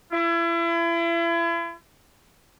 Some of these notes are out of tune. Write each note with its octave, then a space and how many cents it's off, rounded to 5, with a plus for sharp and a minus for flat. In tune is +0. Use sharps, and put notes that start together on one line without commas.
E4 +35